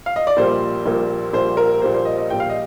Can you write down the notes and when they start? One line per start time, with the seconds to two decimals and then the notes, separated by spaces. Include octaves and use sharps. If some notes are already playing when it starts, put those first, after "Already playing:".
0.06 F5
0.16 D#5
0.27 D5
0.37 A#1 A#2 G3 A#3 C5
0.86 A#1 A#2 G3 A#3
1.33 A#1 A#2 G3 A#3 C5
1.57 A#4
1.82 A#1 A#2 G3 A#3 C5
1.94 C5
2.05 D#5
2.18 D#5
2.30 A#1 A#2 G3 G5
2.40 F5
2.50 D#5